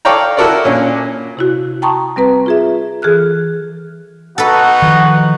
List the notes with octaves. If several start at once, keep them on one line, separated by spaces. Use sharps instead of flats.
A4 C#5 D5 F5 G5 A#5
E4 F#4 A4 A#4 C#5 D5
A#2 C#4 D4
C3 E4 F#4
G5 A5 A#5 C6 C#6 D#6
G3 C4 B4 A#5
F4 G#4 E5
E3 G#4 A4 F6 F#6
B3 D#4 F#4 A4 B4 F#5
D#3 F3